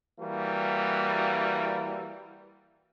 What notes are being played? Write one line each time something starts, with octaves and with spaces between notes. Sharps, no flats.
E3 G3 A#3 F#4